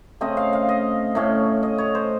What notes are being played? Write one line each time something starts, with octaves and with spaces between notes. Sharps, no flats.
C#3 A3 C4 D#5
F5
F5
D#5
A2 A3 C#4
D#5
C#5
C5